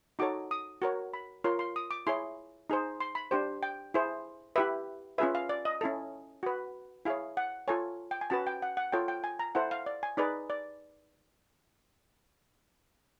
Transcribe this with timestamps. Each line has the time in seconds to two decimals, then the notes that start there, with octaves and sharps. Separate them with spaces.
0.19 D#4 F#4 A4 C#5 D6
0.51 D#6
0.82 F#4 A#4 C#5
1.14 B5
1.44 F4 A#4 C#5 C6
1.59 C6
1.76 D#6
1.91 D6
2.07 E4 G#4 C#5 C6
2.70 D#4 G#4 C5
3.00 C6
3.15 B5
3.31 D4 G4 C5
3.63 G5
3.94 E4 G#4 C5
4.56 E4 G4 B4 E5
5.18 C#4 F4 G#4 B4 E5
5.35 F5
5.49 D5
5.65 D#5
5.81 C#4 E4 A4
6.43 F#4 B4
7.05 E4 G#4 C#5 F5
7.37 F#5
7.68 F4 A4 C#5 G#5
8.11 G5
8.21 G#5
8.30 C#4 F#4 B4 A5
8.47 G5
8.62 F#5
8.77 F#5
8.92 F4 A4 C#5 G5
9.08 G5
9.24 G#5
9.39 A#5
9.55 E4 A4 C5 F#5
9.71 F5
9.86 D5
10.03 G#5
10.17 D#4 G#4 B4 D5
10.50 D5